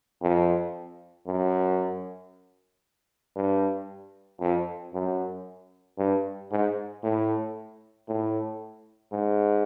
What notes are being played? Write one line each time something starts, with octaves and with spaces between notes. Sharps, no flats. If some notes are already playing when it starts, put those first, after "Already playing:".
F2
F#2
G2
F2
F#2
G2
G#2
A2
A2
G#2